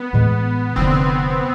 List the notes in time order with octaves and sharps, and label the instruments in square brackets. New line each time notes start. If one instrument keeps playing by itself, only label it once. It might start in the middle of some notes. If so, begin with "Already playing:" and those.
Already playing: [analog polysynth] B3
[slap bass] A1 A2 E3 G#3
[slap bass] F1 F2 D3 [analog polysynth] C4
[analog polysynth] C4